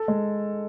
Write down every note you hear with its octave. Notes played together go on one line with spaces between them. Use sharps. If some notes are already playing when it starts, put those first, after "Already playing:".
Already playing: A4
G#3